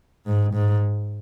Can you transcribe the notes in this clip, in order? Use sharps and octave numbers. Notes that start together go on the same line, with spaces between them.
G#2
G#2